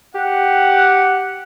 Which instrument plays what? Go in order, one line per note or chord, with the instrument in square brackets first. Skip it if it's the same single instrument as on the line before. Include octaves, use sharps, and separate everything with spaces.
[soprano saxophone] G4 [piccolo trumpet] F#5